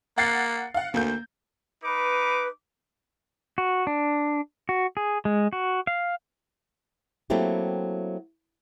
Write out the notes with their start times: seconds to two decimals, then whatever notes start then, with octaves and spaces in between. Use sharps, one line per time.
0.18 A#3 F#5 A6 C7
0.74 F5 F#5
0.94 D2 A#3 G6
1.83 D#4 B4 D6
3.58 F#4
3.87 D4
4.69 F#4
4.97 G#4
5.25 G#3
5.53 F#4
5.87 F5
7.30 F#3 A3 A#3 C4 E4 G4